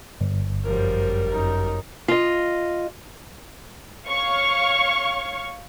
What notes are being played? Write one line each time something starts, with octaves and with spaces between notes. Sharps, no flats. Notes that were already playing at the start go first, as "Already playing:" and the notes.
G1
F#2 F3 G3 A#4
F#2 D#4
F4 D#5
C#5 F5 C#6